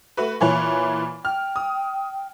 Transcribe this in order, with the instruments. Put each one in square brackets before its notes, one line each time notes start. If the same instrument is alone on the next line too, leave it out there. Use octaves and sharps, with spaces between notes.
[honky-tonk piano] A3 F#4 B4
[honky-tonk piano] A#2 E3 C#5 [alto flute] B5
[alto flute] G5 [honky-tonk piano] F6
[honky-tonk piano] D#6